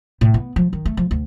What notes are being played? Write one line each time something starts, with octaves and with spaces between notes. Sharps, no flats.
A2
B3
F3
D#3
A3
F3
D2